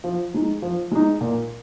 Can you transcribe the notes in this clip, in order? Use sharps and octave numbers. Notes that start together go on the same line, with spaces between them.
F3
G#3 D#4
F3
G#3 D#4
A#2